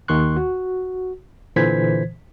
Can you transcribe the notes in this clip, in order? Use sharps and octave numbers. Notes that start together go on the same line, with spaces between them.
D#2 D#3 C6 C#6 F#6
F#4
A#2 D3 E3 C5 G#6 B6